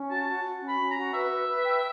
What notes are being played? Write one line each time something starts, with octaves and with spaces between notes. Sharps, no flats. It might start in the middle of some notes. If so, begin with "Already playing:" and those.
Already playing: C#4
F#4 A5
F#4
F#4
C#4
B5
C#4
A#5
F#4
B4 E5
B4
B4
G5